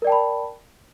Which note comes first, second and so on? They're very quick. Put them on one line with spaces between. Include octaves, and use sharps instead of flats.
A#4 D5 G5 A5 B5